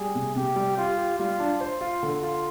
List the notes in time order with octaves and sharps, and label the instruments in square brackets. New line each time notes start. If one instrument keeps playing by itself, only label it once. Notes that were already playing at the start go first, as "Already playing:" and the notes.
Already playing: [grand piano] G3 [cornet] G#4
[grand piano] C3
[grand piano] C3 [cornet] G4
[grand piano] G3
[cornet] F4 [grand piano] G4
[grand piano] G4
[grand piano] G3 [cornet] F4
[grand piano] D4
C5
F4
D3
F4